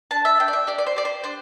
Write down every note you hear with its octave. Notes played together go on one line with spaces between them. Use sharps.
D4 A5
E5
D4 G5
D5
E5
G4 D5
D5
C5
G4 D5
C5
D4 C5